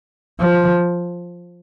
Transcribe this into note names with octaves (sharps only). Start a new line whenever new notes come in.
F3